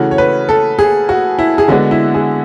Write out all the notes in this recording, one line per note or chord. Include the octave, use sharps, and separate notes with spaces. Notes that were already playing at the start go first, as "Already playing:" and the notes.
Already playing: C#3 E3 A3 F#4
C#5
B4
A4
G#4
F#4
E4
G#4
D3 G#3 B3 D4 F#4
E4
G#4